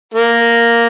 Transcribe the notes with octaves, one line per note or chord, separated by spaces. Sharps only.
A#3